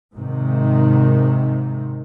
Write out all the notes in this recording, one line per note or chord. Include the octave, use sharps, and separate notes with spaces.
G#1 G#2 C3 D#3